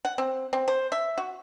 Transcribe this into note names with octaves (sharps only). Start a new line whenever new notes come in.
F#5
C4
C4
C5
E5
F#4